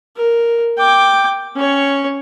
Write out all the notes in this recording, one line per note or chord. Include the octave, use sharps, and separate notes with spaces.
A#4
G5 D6
C#4 C#5